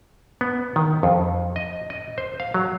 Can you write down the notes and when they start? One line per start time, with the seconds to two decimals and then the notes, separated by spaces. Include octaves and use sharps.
0.41 B3
0.76 D#3
1.03 F2
1.56 D#5
1.90 D#5
2.18 C5
2.40 F5
2.54 F#3